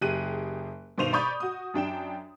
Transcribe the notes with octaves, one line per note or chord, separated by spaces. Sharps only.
F#1 G4 G#4 F#6 D#7
G2 B2 D#3 C5 D#7 F7
D5 B5 C#6 D#6 G6
F#4 D#6
F#2 D4 G5 E7